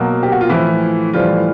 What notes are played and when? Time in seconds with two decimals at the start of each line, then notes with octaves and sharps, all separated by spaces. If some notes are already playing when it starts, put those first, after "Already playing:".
Already playing: B2 F#3 A#3
0.23 G4
0.32 F#4
0.41 F4
0.49 A2 E3 F3 A3 E4
1.13 A2 E3 F3 G3 F4